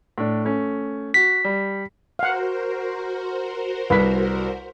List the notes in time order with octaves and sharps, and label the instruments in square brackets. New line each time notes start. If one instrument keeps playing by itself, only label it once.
[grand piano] A2 D4
A3 C#4
[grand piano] F#4 [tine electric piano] B6
[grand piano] G3
[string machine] F#4 A#4 C5 [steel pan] F5 F#5
[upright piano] C2 B6 [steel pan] B4